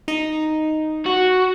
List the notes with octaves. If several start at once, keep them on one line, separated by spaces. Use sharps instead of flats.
D#4
F#4